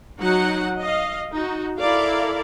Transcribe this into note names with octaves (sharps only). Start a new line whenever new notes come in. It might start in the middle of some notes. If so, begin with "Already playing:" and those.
F#3 D#4 F#4 F#5
D#5 F5
D#4 F#4
E4 A4 A#4 D5 F5